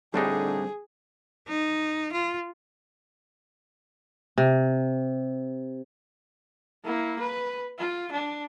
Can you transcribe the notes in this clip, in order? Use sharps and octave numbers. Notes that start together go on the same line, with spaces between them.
A2 D3 G3 C4 D4 D#4 G4 G#4
D#4
F4
C3
A#3 E4
B4
F4
D4